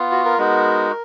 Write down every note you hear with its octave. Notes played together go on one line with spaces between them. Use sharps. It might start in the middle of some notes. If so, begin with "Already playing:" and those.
Already playing: B3 F4
F#4
A#4
G#3 B3 D#4 F#4